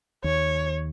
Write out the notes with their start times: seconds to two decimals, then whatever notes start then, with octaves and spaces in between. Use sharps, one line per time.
0.24 D#2 C#5